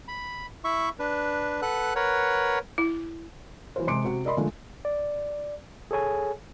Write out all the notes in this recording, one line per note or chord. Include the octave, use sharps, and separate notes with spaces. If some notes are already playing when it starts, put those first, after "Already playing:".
B5
E4 E5 C#6
D4 B4
A4 B4 F#5 F#6
A#4 B4 C#5 F#5
E4
E3 F#3 C5
C3 G#3 C6 D6 C#7 D7
C3 F#4
A#4 D5 D#5 B5 C6
D3 F3 G#3 A3
D5
G#4 A4 C#5 G#5